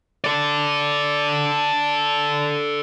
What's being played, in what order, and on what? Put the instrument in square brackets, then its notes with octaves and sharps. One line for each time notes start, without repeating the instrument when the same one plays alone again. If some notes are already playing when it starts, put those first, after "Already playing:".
[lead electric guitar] A4 D5